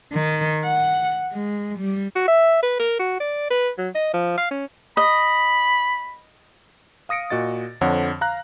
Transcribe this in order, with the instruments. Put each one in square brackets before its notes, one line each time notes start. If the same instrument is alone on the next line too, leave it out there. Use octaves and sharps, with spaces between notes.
[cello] D#3
F#5
G#3
G3
[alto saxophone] F#4
E5
B4
A#4
F#4
D5
B4
F#3
D#5
F3
F5
C#4
[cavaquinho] D#5 [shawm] B5
[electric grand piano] F5 D#6 A#6 C#7 D7
A#2 F#4 D#5 A6
F2 D3 F3 C#5 F#5
F5 A#5 F#6